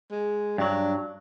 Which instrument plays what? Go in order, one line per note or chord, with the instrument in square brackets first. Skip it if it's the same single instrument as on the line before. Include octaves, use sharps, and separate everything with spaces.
[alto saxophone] G#3
[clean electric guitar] G2 F#3 [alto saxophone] D4